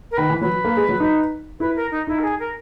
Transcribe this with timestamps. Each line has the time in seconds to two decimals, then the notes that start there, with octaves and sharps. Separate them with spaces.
0.11 A#4
0.17 D#3 B4
0.30 E3
0.41 F#3 B4
0.64 A#3
0.77 G#3
0.89 F#3
1.00 D#4
1.59 E4 B4
1.75 A#4
1.91 D#4
2.07 D#4 E4
2.19 A#4
2.23 G#4
2.39 A#4